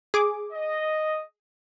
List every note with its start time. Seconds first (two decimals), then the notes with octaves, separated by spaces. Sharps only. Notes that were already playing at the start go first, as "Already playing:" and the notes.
0.14 G#4 D6
0.53 D#5